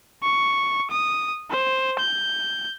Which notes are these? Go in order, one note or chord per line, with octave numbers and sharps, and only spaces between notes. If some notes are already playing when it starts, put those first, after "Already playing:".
C#6
D#6
C5
G6